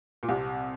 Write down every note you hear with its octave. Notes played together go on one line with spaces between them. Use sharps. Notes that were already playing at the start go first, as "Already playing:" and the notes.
A#2
C2 C3